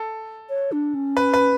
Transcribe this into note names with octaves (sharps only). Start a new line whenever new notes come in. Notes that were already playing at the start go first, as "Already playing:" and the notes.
Already playing: A4
C#5
D4
C#4
B4
B4